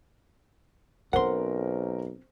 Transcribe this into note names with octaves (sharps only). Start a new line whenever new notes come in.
B1 C4 C#4 A#4 C5 F#5 C6